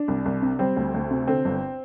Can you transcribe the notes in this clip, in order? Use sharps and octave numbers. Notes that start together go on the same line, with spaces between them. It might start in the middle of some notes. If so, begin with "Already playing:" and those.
Already playing: D4
C2
C2
C3
G3 C4
D2
D2
C3
D3 C4
G1